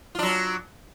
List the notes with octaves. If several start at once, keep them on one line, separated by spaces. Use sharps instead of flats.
F#3 D4 F4